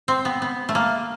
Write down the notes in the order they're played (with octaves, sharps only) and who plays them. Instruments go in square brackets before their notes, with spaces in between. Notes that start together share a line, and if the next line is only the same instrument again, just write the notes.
[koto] C4
B3
B3
A3
A#3